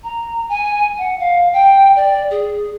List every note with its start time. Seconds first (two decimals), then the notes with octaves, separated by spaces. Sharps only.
0.03 A#5
0.49 G#5
0.98 F#5
1.19 F5
1.53 G5
1.96 D5
2.30 G#4